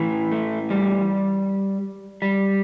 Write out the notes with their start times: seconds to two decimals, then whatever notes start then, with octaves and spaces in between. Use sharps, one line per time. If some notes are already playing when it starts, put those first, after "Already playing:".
Already playing: A2 E3
0.32 A3
0.70 G3
2.22 G3